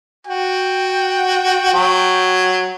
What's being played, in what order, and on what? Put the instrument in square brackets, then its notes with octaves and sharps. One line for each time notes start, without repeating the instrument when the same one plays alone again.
[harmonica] F#4 [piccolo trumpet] G5
[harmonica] F#3